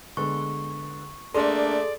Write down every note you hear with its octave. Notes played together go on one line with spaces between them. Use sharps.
D3 G#3 B3 C#6
A3 A#3 D4 G#4 A4 D5 C6